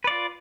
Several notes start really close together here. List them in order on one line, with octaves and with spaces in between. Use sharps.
B4 D5 F4